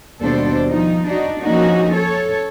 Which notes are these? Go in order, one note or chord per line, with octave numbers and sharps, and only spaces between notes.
D#2 B2 G3 D4 A4 C5
F3 D#4
D4 D#4 F#4
F3 A#3 C#4 D#4 F#4
A4 C#5